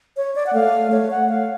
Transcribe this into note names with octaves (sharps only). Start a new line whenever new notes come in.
C#5
D5
F#5
A3 F5
A3 C#5
F#5
F5